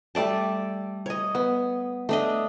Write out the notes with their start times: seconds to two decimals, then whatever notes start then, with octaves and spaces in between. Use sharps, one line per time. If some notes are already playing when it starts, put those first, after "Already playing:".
0.15 G3 A3 D5 A5
1.06 C#5 D#5
1.35 B3
2.09 A3 D4 D#5